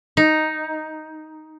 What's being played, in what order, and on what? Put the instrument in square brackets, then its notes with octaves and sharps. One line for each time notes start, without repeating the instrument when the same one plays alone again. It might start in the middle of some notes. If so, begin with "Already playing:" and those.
[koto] D#4